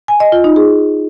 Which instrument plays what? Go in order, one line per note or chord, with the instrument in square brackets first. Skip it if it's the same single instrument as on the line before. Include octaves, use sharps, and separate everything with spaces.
[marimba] G#5
D#5
F4
D#4
G#4